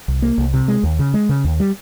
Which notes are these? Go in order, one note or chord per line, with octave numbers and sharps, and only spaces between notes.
C2
A#3
C2
C3
G#3
D#2
C#3
G#3
C#3
D#2
G3